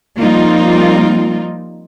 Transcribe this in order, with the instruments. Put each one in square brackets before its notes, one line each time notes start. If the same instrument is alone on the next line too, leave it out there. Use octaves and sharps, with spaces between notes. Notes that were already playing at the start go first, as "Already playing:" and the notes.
[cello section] F3 G3 A#3 C4 D#4 F4